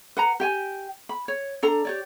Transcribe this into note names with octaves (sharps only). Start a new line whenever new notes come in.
B4 F#5 A#5
G4 G5 G#5
B5
C#5
D4 A4 A#5
G4 C#5 D5